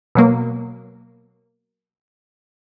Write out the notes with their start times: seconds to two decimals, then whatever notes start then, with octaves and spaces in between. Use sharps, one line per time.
0.15 B2 F#3 A#3